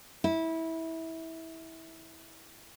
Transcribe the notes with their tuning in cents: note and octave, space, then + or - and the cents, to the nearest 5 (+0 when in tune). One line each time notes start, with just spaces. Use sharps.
E4 -20